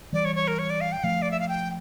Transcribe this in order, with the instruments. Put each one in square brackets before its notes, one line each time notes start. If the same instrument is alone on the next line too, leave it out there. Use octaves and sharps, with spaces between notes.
[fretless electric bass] E3 G3 [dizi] D5
[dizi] C#5
C#5
A#4
C#5
D5
F5
G5
[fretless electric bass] F3 A3 [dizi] F5
[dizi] D5
E5
F5
G5